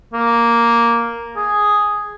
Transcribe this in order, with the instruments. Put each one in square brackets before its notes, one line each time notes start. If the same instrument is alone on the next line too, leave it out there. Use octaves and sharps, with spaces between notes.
[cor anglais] A#3
G#4